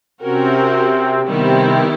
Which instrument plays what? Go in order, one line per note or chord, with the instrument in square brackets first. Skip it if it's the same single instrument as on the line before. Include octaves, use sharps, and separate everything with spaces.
[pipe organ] C3 C4 [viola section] C#4 F#4 A#4
[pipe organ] C3 C4 [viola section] D#3 G3 B3 E4